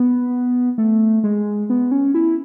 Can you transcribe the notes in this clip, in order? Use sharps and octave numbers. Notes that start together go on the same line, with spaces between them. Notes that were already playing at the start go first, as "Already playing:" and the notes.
Already playing: B3
A3
G#3
B3
C#4
E4